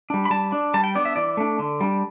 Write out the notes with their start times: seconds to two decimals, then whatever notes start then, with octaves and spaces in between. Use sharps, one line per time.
0.10 G3 D4
0.25 B5
0.30 G3 A5
0.52 D4
0.74 G3 A5
0.84 G5
0.95 B3 D4 D5
1.05 E5
1.16 E3 D5
1.37 A3 D4
1.59 D3
1.81 G3 D4